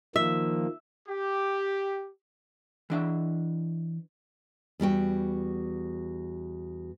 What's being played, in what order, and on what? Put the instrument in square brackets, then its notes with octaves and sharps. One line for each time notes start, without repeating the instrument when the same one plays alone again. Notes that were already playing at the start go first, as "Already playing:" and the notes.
[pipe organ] D#3 F3 A#3 [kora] E5
[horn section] G4
[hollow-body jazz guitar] E3 D4 E5
[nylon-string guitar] E2 G3 F#4 G5